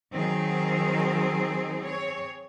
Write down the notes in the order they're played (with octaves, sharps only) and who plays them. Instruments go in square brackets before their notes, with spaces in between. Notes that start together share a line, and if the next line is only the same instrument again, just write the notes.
[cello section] D#3 F#3 D#4 [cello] C4 G#4
[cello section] C#5